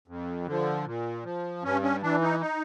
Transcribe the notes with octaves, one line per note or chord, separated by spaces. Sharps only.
F2
D3 F3
A#2
F3
G2 C#4
C#4
E3 D4
D#4
D#4